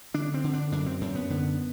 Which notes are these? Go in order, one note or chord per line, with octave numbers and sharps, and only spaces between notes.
D3 D4
C4
D3
D4
F#2 D4
C4
F#2 C4
B3
D3 B3